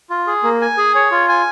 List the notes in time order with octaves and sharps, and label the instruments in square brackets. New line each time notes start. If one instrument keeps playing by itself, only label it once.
[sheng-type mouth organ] F4
G#4
A#3
G#5
G#4
C#5
F4
G#5